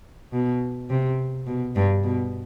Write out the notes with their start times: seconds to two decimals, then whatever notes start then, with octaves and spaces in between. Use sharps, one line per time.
0.32 B2
0.89 C3
1.47 B2
1.76 G2
2.04 B2